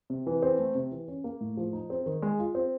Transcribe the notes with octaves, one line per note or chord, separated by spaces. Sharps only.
C3
E3
C4
A3
C3
E3
C#4
A#3
A2
F3
D#4
C4
D#3
G#3
F4
C4